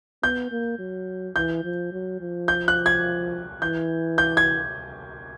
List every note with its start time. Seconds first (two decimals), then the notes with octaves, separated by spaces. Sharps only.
0.23 B3 G6
0.52 A#3
0.79 F#3
1.36 E3 G6
1.64 F3
1.92 F#3
2.21 F3
2.48 G6
2.68 F#6
2.86 G#6
3.62 E3 G6
4.18 G6
4.37 G#6